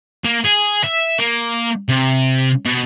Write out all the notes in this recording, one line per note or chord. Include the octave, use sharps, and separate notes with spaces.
A#3
G#4
E5
A#3
C3
B2